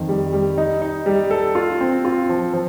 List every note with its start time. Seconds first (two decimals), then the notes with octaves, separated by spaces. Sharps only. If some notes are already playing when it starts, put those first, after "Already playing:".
Already playing: F2 D#3
0.09 G3
0.33 G3
0.58 D#4
0.82 D#4
1.06 G3
1.31 A4
1.55 F4
1.81 C4
2.05 F4
2.29 F3
2.53 F3